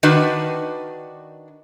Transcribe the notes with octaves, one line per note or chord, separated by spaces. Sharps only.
D#3 D4 F#4 B4